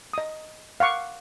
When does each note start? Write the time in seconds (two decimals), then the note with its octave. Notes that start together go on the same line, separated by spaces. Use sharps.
0.13 D#5 D#6
0.80 F5 F#5 C#6 D6